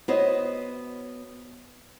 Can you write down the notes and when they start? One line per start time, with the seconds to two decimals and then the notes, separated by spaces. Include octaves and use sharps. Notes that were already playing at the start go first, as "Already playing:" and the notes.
0.08 B3 F#4 C5 C#5 D#5